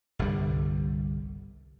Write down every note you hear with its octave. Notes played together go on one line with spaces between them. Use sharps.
G1 C2 D3 G3